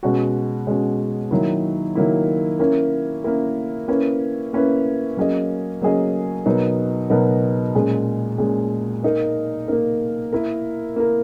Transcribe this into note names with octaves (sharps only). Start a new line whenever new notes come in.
B2 G#3 C#4 F#4
B2 G#3 C#4 F#4
D#3 F#3 A#3 E4
D#3 F#3 A#3 E4
A#3 C#4 E4 A#4
A#3 C#4 E4 A#4
A#3 C#4 E4 B4
A#3 C#4 E4 B4
F#3 A#3 C#4 G#4 D#5
F#3 A#3 C#4 G#4 D#5
B2 F#3 B3 D#4 A#4
B2 F#3 B3 D#4 A#4
A#2 G#3 C#4 G#4
A#2 G#3 C#4 G#4
A#3 D#4 A#4
A#3 D#4 A#4
A#3 E4 A#4
A#3 E4 A#4